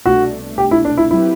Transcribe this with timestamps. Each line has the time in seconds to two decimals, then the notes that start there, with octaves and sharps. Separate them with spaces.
0.05 C2 B2 A3 D4 F#4
0.58 G4
0.71 E4
0.85 D4
0.97 E4
1.11 F#3 C4 E4 G4 B4